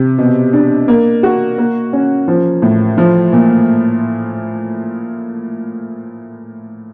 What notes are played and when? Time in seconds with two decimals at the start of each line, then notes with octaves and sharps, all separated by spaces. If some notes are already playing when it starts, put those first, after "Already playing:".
Already playing: C3
0.18 B2
0.53 D4
0.88 A#3
1.23 F#4
1.58 A#3
1.93 C#4
2.28 F3
2.62 A2
2.98 F3
3.33 A#2